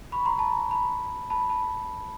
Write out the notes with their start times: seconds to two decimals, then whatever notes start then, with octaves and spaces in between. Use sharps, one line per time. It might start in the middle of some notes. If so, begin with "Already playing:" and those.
0.12 B5 C#6
0.25 A#5 C6
0.39 A5 B5
0.52 A#5 C6
0.71 A5 B5
1.30 A5 B5
1.49 A5 B5